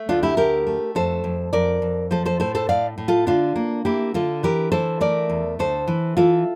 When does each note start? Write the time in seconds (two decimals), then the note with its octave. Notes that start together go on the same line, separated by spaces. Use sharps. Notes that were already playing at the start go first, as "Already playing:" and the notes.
Already playing: A3
0.09 D2 D4 F4
0.23 E4 G4
0.37 A3 G4 A#4
0.67 A3
0.95 F2 A4 C5
1.24 F2
1.53 F2 A#4 D5
1.82 F2
2.11 F3 A4 C5
2.26 A4 C5
2.40 A2 A4 C5
2.55 A4 C5
2.69 A2 D5 F5
2.98 A2
3.08 F4 A4
3.27 D3 D4 F4
3.56 A#3
3.85 A#3 E4 G4
4.14 D3 F4 A4
4.43 E3 G4 A#4
4.72 E3 A4 C5
5.01 A3 A#4 D5
5.30 E2
5.59 D2 A4 C5
5.88 E3
6.17 E3 F4 A4